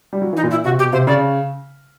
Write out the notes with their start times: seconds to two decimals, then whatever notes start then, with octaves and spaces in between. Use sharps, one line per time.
0.13 G3
0.22 F#3
0.33 E3
0.37 D#4
0.43 A#2
0.51 E4
0.64 C3 F#4
0.79 B2 G4
0.93 C3 C5
1.07 C#3 D5